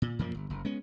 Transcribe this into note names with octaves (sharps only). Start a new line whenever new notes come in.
A#2
F#2 A#2 F3 A#3
G1
F#1
G#3 B3 C#4